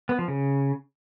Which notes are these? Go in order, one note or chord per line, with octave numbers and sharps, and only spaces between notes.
B3
F3
C#3